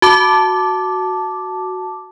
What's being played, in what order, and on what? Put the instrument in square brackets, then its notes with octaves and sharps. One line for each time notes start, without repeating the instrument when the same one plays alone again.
[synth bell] F#4 A5 D6